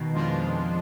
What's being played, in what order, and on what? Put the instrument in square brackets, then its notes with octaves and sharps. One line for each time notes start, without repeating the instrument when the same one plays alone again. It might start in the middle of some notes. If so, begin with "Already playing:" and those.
Already playing: [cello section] B2 D#3
[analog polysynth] F2 F3 G#3 D4 F4